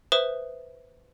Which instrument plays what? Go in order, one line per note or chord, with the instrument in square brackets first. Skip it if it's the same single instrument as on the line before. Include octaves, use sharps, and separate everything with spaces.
[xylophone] B4 C5 E5 D#6 E7 G7